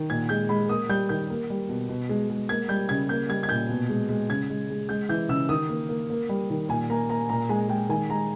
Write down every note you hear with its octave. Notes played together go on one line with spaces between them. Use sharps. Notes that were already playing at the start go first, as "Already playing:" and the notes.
Already playing: D#3
A#2 G#6
G#3 G6
G#3 B5
A#3 D#6
G3 G6
D#3 G6
A#3
G3
B2
B2
G#3
G#3
A#3 G#6
G3 G6
C#3 G#6
A#3 G6
G3 G#6
G#6
A#2 G6
B2
G#3
G#3
C#3 G#6
G#3
G#3
G#3 G6
E3 G6
C#3 E6
D#3 D#6
A#3
A#3
A#3
G3
D#3
A#2 G#5
A#3 A#5
A#3 A#5
A#2 A#5
G#3 G#5
G#3 G5
D#3 G#5
G#3 A#5